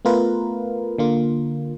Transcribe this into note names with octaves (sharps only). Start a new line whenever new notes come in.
A3 B3 F4 A#4 B4
D3 A#3 F4